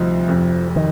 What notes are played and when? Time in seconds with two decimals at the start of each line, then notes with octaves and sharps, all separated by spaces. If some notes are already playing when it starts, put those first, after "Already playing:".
Already playing: D2 C3 F3 G3 C4 D#4
0.28 F1 F2 C3
0.76 D#3